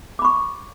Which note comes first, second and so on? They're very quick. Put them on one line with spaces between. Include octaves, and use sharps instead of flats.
D6 B5 C#6